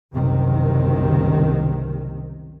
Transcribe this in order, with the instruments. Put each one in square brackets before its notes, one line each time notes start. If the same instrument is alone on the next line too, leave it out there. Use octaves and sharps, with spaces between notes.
[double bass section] F#1 C2 C3 D#3